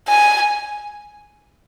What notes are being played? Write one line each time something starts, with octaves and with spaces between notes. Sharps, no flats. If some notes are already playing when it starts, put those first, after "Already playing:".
G#5